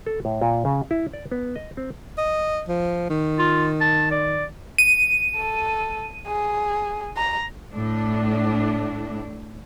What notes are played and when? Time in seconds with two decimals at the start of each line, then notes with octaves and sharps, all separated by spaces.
0.06 A4
0.25 A2
0.41 A#2
0.65 C#3
0.91 E4
1.13 D5
1.31 B3
1.56 D#5
1.77 C4
2.18 D#5
2.68 F3
3.10 D#3
3.38 F4
3.80 A5
4.11 D5
4.78 D#7
5.37 A4
6.27 G#4
7.17 A#5
7.73 A2 D4